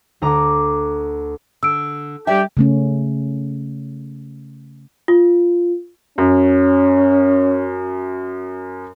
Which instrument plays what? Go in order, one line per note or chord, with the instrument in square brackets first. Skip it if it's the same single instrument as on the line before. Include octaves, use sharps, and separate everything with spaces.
[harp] D2 A#5 D6
[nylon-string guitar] D3 [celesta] E6 D7
[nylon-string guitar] G3 D5 E5 [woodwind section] D4 G4 [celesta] G5
[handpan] C#3 A3 C#4
[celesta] F4
[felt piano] F#2 [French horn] C#4